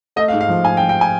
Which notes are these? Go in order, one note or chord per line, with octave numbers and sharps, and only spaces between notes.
A3 D#5
F5
G#2
F5
F3
G#2 G#5
G5
F3
G5
G#5